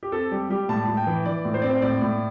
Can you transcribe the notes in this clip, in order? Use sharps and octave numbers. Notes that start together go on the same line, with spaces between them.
G4
C4 A4
G3 G4
G3 G4
A2 A5
A2
G5
E3
E3 D5
A2
C5
C4 D5
C5
A2 D5
A2